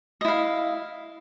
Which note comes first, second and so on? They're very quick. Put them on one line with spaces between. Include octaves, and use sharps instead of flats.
D#5 E4 F5